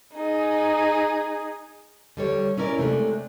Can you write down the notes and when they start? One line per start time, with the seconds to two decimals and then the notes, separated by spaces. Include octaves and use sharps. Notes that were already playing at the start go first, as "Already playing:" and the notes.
0.14 D#4 G#4
2.17 D3 G3 C#5
2.58 C#4 E4 A#4 C#5 D5
2.78 C3 G#3 A3 C#4 D4